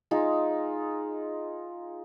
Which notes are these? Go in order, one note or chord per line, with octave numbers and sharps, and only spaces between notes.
G#3 D#4 F4